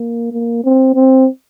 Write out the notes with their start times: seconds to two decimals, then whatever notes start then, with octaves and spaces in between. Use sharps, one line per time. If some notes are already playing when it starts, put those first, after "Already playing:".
Already playing: A#3
0.32 A#3
0.64 C4
0.94 C4